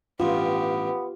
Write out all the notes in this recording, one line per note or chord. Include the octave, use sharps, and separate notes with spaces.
A1 G2 B3 F4 G4